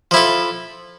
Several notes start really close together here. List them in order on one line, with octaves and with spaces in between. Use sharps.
F3 E4 A4